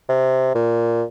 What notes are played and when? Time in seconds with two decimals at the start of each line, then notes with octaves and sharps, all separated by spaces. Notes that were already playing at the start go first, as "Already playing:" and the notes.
0.09 C3
0.55 A#2